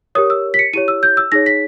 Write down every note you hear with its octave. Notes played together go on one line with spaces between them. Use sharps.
G4 A#4 C#5 D#6
E6
B6
C#7
E4 G4 C#5 D#7
E6
G6
E6
D#4 G#4 C#5 A#6
B6